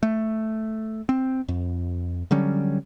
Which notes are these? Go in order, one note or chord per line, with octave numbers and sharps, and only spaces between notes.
A3
C4
F2
D3 F#3 G3 C#4